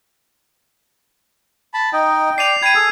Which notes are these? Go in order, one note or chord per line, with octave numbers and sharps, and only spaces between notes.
A5 B5
D#4 D#5 G5
D5 C7 D#7 F7
G5 B5 G#6 C7 D#7
G#4 A4